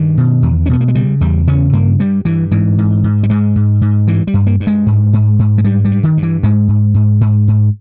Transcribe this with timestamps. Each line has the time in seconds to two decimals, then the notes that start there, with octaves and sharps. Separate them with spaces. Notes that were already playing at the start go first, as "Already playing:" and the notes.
Already playing: G2 D#3
0.18 B2
0.42 E2
0.66 C#4
0.69 B2 B3
0.81 A#3
0.88 G#3
0.95 C#3 G3
1.21 E2 G3
1.47 C#3 C#4
1.73 G2 A#3
1.99 G2 G3
2.25 G2 E3
2.51 G#2 E3
2.78 G#2
3.04 G#2
3.23 G3
3.30 G#2 G#3
3.56 G#2
3.81 G#2
4.08 G2 E3
4.27 G3
4.34 G2
4.47 A#3
4.60 G2
4.67 G#3
4.86 G#2
5.13 G#2
5.39 G#2
5.58 G#3
5.65 G2 G3
5.85 G3
5.91 G2
6.03 D#3
6.17 G2
6.23 E3
6.43 G#2 G#3
6.68 G#2
6.94 G#2
7.21 G#2
7.48 G#2